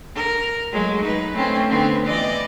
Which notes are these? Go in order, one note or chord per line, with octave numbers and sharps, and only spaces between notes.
A#4
F#3 G#3 A3
D#4 B4
A3 C4 C#4
D3 B3 C4
E3 D5 D#5